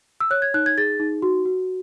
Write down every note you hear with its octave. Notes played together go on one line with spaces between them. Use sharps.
E6
C#5 F#6
G#6
D#4 F#6
G#6
G#4 A6
D#4
F#4
F#4